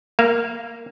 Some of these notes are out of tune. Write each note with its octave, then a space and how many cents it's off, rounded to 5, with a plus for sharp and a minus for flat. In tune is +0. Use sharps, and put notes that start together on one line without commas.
A#3 +0 F5 -40 A#5 +0